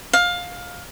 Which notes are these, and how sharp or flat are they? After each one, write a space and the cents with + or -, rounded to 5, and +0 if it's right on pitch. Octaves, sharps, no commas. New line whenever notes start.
F5 +20